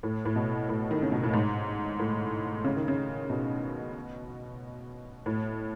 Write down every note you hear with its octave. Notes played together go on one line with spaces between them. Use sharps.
A2
A2
B2
A2
D#3
C#3
B2
A2
G#2
A2
C#3
D#3
C#3
B2
A2